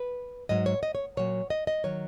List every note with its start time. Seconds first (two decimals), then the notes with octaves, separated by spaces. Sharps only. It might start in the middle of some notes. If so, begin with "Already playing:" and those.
Already playing: B4
0.49 G#2 F#3 D#5
0.66 C#5
0.83 D#5
0.95 C#5
1.17 A#2 F#3 C#5
1.50 D#5
1.67 D#5
1.84 D#3 F#3 C#5